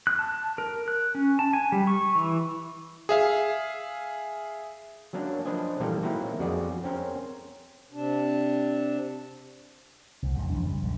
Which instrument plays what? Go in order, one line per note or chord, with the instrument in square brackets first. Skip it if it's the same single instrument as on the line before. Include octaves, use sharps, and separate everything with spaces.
[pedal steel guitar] F#6
A5
A#4
F#6
C#4
A5
G#5
G3
C#6
E3
[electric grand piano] G#4 E5 F5
[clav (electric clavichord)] F#3 A#3 C#4 D4
F3 D4 B4 C5 D#5 G#5
A#2 D#3 E3 G3 A#3 A4
D#3 F#3 A#3 C4 D#4 E4
F2 F#4 G#4 D5
C4 C#4 A#4 C5
[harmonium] C3 D4
[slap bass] C2
F2 G#2 G#3
A1 F2 E3 D4
C#3 G3
A#1 F#2 D3